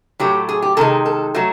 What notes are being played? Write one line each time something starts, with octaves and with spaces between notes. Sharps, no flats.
A2 F#3 A3 G4
G#4
G4
C3 D#3 G#3 A4
A4
F#3 A3 F#4